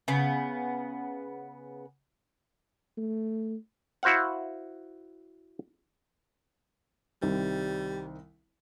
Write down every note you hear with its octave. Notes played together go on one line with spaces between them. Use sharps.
C#3 B3
A3
E4 F#4 C5 F5 F#5
C2 D#3 G3 C4